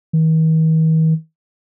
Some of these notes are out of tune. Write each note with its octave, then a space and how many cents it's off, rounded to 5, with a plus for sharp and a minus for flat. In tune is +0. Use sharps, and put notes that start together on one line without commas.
D#3 +45